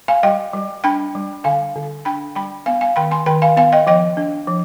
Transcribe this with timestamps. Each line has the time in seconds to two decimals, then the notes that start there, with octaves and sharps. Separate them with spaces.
0.08 F5 G#5
0.23 G3 D#5 G5
0.54 G3
0.84 D4 G5 B5
1.15 G3
1.44 D3 F5 G#5
1.76 D3
2.05 D4 G5 B5
2.35 G3 G5 B5
2.66 B3 F5 G#5
2.81 F5 G#5
2.96 D#3 G5 B5
3.11 G#5 C6
3.26 D#3 G5 B5
3.42 F5 G#5
3.57 B3 F5 G#5
3.72 D#5 G5
3.87 F3 D#5 G5
4.17 D4
4.47 F3